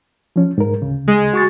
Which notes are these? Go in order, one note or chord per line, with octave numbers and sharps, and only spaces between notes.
F3 C#4
G#2 A#4
D2 C#3
G#3
F#4 C#6 A6